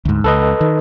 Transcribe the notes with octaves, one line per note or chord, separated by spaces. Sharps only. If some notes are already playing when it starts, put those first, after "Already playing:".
D2 G#2
C#2 A4 B4 D#5
D#3